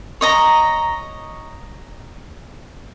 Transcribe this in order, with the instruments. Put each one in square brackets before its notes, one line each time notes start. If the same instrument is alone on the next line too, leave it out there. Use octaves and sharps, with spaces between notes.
[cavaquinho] C#5 D#5 A#5